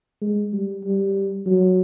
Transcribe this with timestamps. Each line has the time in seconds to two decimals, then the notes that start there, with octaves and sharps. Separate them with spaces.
0.22 G#3
0.53 G3
0.85 G3
1.46 F#3